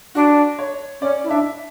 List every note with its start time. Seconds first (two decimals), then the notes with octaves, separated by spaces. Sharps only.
0.15 D4 F#4
0.59 C#5
1.01 C#4 D5
1.24 E4
1.29 D4 E5